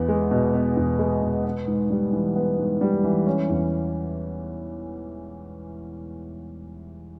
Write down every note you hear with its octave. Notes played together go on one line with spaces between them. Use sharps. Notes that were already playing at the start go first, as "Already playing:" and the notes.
Already playing: E2 B3
G#3
B2
B3
E2
G#3
B2
B3
G#2
G3
E3
B3
G#2
G3
E3
C#4
E2